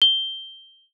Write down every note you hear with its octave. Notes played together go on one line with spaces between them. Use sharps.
G7